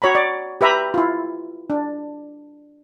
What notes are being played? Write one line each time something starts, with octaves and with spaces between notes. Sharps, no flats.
F#4 C#5 A#5 B5
D5
G4 B4 E5 A#5 B5
E4 F4
D4